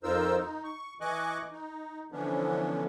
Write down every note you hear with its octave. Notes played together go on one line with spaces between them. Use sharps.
F2 D#4 F4 A#4 C5 E6
D#4
C#6
E3 D#5 G#5 C#6 D6 F#6
D#4
D3 E3 F3 B3 C#4 D4